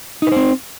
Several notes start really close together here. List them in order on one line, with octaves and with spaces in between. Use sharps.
D#4 B4 C5 C4